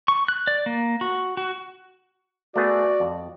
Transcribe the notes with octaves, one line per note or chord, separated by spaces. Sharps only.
C#6
F#6
D5
A#3
F#4
F#4
A3 B3 F#4 G#4 D5
F2